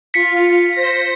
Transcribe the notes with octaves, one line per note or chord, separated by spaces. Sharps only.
F4 B6 C#7
C5 A#6